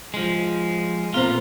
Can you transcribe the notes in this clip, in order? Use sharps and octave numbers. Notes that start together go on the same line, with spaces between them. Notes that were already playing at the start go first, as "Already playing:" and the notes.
F3 G#3
A#2 B3 C4 F4 C5